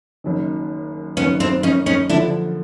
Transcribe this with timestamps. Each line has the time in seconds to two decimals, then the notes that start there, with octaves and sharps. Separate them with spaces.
0.24 F#1 F#2 D#3
1.17 F#1 F#2 D#3 B3 C#4
1.40 C4 D4
1.63 C#4 D#4
1.86 C#4 D#4
2.09 D3 F3 D4 E4